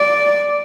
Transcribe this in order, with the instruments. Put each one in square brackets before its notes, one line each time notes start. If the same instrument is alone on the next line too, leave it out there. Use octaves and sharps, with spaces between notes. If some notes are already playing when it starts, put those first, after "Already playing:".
Already playing: [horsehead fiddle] D5